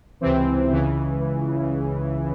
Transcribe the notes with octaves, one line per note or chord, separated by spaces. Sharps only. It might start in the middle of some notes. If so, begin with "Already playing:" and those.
C#2 C3 E3 C4
C#2 C#3 E3